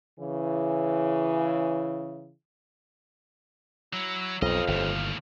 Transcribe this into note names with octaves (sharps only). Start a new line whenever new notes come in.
C#3 E3
F#3 E4
B1 F2 F#3 D#5 F5
G1 D#2 A2